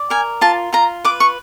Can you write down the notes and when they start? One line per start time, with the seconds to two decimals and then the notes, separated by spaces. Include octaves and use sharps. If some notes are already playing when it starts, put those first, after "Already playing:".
Already playing: D5
0.10 A#4 G#5
0.41 F4 A5
0.73 F4 A#5
1.04 B4 D6
1.20 C#6